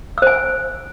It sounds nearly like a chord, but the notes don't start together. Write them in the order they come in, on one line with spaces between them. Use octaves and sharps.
E6 C5 G#5